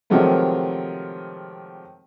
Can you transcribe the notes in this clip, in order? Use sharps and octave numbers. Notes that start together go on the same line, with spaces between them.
C3 D#3 F3 F#3 G#3 A3